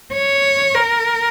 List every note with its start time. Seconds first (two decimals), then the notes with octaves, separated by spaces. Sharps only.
0.13 C#5
0.75 A#4